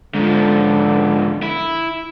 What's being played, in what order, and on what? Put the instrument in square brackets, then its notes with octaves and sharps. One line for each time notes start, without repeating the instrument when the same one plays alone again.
[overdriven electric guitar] G#2 F3 [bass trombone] D3
[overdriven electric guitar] E4